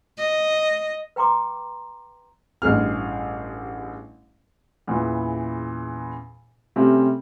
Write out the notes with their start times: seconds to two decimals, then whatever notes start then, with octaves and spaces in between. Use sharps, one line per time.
0.18 D#5
1.16 B4 G5 A#5 C6 D6
2.62 A1 G2 G#4 F6
4.87 E2 A#2 C#3 E3
6.76 C3 G3 A3 C4 C#4